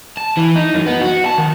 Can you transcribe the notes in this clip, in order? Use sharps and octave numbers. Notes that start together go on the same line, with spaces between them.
A5
E3
D#4
F#2
B3
F#4
A5
D#3